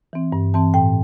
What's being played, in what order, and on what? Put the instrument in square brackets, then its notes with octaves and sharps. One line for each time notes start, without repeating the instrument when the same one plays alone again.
[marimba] E3 C4
G2
E3 C4 A5
A2 G5